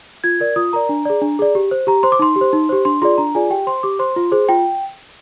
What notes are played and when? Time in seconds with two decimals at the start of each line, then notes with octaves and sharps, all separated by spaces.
0.24 F4 G#6
0.40 A#4 D5
0.56 F4 D#6
0.73 A#4 D5 A#5
0.89 D4
1.05 G#4 D5
1.21 D4
1.39 G#4 D5
1.55 G4
1.71 C5
1.87 G4 A#5
2.03 C5 C6
2.12 D6
2.19 D#4 C6
2.36 G4
2.41 C5
2.53 D#4
2.69 G4 C5
2.85 D4 C6
3.02 F4 G#4 D5 C6
3.18 D4 A#5
3.35 F4 G#4 D5 G#5
3.50 G4 G5
3.67 C5 C6
3.83 G4 D6
3.99 C5 C6
4.16 F4
4.32 G#4 C5
4.49 F4 G5